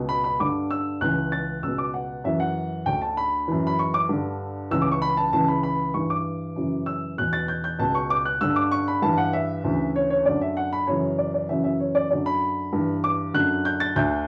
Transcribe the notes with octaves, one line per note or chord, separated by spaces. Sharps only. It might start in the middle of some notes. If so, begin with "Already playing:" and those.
Already playing: C#2 B2
B5
B5
G2 D3 D6
E6
C#2 C#3 E3 F#6
A6
C#2 B2 E6
D6
F#5
F#2 E3 E5
F#5
D2 D3 G5
A5
B5
F#2 E3
B5
C#6
D6
G2 D3
C#2 C#3 E3 E6
D6
C#6
B5
A5
C#2 C#3 E3 A5
B5
B5
G2 E3 C#6
D6
F#2 C#3 E3
E6
E2 B2 F#6
A6
G6
G6
C#2 B2 A5
C#6
D6
F#6
G2 D3 E6
D6
C#6
B5
G2 E3 A5
F#5
E5
D2 C#3 E3
C#5
C#5
F#2 D3 D5
E5
F#5
B5
F#2 C#3 E3 C#5
D5
D5
F#2 C#3 E3 E5
E5
C#5
D5
F#2 D3 D5
B5
G2 E3
D6
F#2 D3 F#6
G6
A6
D2 D3 G6